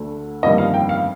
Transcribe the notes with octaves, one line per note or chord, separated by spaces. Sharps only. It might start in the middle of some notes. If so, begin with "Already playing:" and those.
Already playing: D2 D3 A3
G1 F2 D#3 G3 A#3 D#5
F5
G5
F5